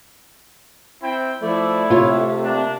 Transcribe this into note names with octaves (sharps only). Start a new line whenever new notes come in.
C4 E4 G5
F3 A3 E4 D5
C3 F4 C#5
A#3 D4